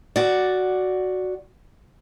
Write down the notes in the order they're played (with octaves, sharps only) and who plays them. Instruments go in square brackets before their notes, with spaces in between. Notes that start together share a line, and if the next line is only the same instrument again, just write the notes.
[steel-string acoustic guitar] F#4 D5